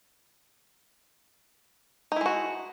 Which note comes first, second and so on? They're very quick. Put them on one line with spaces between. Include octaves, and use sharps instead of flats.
D#4 E4 G#3 F#4